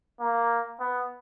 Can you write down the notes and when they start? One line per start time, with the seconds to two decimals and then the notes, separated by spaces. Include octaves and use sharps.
0.20 A#3
0.80 B3